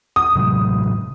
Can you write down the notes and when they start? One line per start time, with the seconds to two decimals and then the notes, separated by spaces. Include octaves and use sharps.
0.16 D#6
0.35 A2 C3 F#3